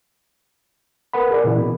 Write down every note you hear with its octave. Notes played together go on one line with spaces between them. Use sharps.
A#4 B4 F#5 B5
G#4 A#4 D5
A#2 C#3 E3 E4
B2